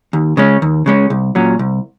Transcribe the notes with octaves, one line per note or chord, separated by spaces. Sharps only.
D#2
C#3 G#3 C#4
D#2
C#3 G#3 C#4
C2
A#2 F#3 C#4
C2